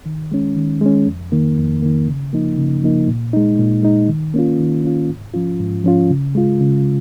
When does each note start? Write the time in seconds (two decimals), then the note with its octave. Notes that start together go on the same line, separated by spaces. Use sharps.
0.06 D#3
0.32 G#3 C#4
0.57 D#3
0.81 G#3 C#4
1.07 F2
1.32 D#3 A#3
1.58 F2
1.82 D#3 A#3
2.07 C#3
2.33 F3 A#3 D#4
2.58 C#3
2.83 F3 A#3 D#4
3.08 A#2
3.33 G#3 D#4
3.59 A#2
3.83 G#3 D#4
4.09 D#3
4.34 A#3 C#4 F4
4.59 D#3
4.84 A#3 C#4 F4
5.09 G#2
5.34 F3 C#4 F4
5.60 G#2
5.84 F3 C#4 F4
6.10 C#3
6.35 G#3 F4
6.61 C#3